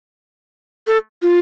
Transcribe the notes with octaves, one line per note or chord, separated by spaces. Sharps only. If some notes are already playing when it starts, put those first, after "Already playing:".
A4
F4